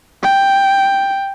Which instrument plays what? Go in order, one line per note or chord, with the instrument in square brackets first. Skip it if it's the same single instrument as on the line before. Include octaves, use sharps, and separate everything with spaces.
[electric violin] G5